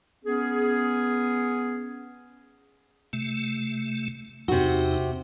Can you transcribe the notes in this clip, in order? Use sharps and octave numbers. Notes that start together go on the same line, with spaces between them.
B3 C#4 G#4
C3 A3
E2 C3 D#4 F#4